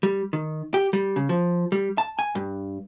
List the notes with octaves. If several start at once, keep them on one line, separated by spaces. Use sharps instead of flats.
G3
D#3
G4
G3
C#3
F3
G3
A5
G#5
G2